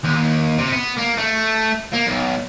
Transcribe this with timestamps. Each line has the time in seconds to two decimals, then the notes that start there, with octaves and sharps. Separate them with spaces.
0.04 D#2
0.58 C3
0.72 B3
0.97 A#3
1.17 A3
1.94 A#3
2.07 B1